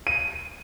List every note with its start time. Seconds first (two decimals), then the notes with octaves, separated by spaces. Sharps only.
0.07 D#7